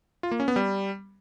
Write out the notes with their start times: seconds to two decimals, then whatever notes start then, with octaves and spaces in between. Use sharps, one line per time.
0.23 F4
0.31 A#3
0.40 C#4
0.48 B3
0.56 G3